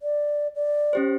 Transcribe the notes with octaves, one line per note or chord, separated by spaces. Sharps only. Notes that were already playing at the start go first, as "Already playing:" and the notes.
D5
D5
C#4 G4 C5